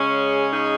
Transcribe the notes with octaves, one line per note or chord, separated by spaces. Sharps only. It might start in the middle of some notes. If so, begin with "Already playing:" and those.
Already playing: C#3 G#3 C#4 G#4 C#5
D#4 G#4